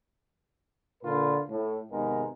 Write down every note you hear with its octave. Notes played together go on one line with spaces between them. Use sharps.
A#2 D3 F4 A#4 B4
A2
G#1 C3 G#3 B3 D#4 A#4